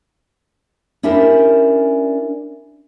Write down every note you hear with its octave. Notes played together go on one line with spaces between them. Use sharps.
C#4 D4 E4 G4 A#4 C5